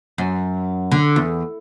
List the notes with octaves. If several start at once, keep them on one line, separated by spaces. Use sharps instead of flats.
F#2
D3
E2